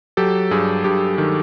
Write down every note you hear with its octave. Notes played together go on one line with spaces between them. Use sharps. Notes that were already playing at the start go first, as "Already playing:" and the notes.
F#3 G4 A4
G2 G#4
G2 G4
D#3